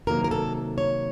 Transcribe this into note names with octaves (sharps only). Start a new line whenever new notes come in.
C3 D#3 F#3 A#3 A#4
A#4
A4
C#5